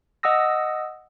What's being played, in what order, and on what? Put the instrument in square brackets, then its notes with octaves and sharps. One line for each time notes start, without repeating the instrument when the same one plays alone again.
[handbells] D#5 F#5 D#6 E6 A#6